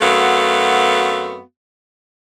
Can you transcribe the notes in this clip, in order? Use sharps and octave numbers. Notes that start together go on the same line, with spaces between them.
F#2 A3 B3 C4 F#4 F5